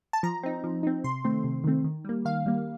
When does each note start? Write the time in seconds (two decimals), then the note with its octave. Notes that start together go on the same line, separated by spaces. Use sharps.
0.13 A5
0.23 F3 A#5
0.43 C4 D#4
0.64 F3
0.83 C4 D#4
1.04 C3 C6
1.24 D#3 A3 C4
1.44 C3
1.64 D#3 A3 C4
1.84 D#3
2.05 G3 A#3
2.25 D#3 F5
2.46 G3 A#3